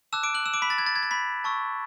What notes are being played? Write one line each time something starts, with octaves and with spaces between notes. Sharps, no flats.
A5 D6 E6 F#6 E7
D6 D7
F#6 F#7
E6 E7
D6 D7
B5 B6
A6
G#6
A6
G#6
A6
B5 B6
A5 C#6 E6